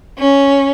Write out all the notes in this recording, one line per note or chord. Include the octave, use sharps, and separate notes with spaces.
C#4